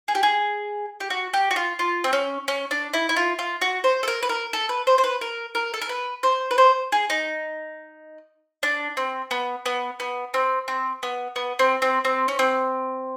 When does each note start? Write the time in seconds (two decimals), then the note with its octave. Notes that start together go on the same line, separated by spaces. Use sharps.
0.08 G#4
0.15 G4
0.23 G#4
1.00 G4
1.10 F#4
1.34 G4
1.51 F#4
1.56 F4
1.79 F4
2.04 C4
2.13 C#4
2.48 C#4
2.71 D4
2.93 E4
3.09 E4
3.16 F4
3.39 F4
3.61 F#4
3.84 C5
4.03 A4
4.08 A#4
4.23 B4
4.29 A#4
4.53 A4
4.69 B4
4.87 C5
4.98 C5
5.04 B4
5.21 A#4
5.55 A#4
5.74 A4
5.82 A#4
5.89 B4
6.23 C5
6.51 B4
6.58 C5
6.92 G#4
7.10 D#4
8.63 D4
8.97 C4
9.31 B3
9.66 B3
10.00 B3
10.34 C4
10.68 C4
11.03 B3
11.36 B3
11.59 C4
11.82 C4
12.05 C4
12.28 C#4
12.39 C4